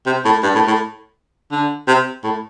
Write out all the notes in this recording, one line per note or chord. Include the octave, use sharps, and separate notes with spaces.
C3
A2
G2
A2
A2
D3
C3
A2